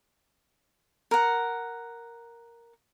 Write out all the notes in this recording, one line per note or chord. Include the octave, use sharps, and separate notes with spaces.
A#4 F#5